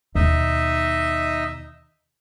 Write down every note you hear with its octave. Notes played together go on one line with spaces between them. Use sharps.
D#2 B2 D#4 D#5 E5